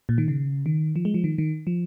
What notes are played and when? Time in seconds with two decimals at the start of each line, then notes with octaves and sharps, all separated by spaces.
0.09 A#2
0.18 D#3
0.28 C#3
0.66 D#3
0.96 F3
1.05 G#3
1.14 F3
1.24 D#3
1.38 D#3
1.67 F3